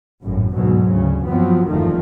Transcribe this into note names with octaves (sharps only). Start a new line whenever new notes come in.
G#1 F#2 A2
D2 G#2 B2 F#3
D2 C#3
G2 F3 F#3 B3 C4
F#1 E2 G2 D#3 F3 A3